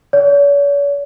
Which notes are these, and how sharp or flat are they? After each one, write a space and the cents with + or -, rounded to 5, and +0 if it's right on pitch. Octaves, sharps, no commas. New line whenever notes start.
C#5 +45